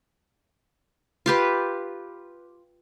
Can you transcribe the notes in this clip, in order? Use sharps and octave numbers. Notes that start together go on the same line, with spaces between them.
F4 G4 B4